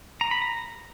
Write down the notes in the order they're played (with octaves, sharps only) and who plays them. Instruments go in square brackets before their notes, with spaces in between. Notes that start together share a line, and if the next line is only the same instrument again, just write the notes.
[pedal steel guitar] A#5
B5
A#5